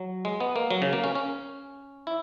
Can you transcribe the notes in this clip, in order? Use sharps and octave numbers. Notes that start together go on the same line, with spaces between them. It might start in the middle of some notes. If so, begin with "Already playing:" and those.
Already playing: F#3
G#3
B3
A#3
F#3
C#3
A#3
C#4
C#4
E4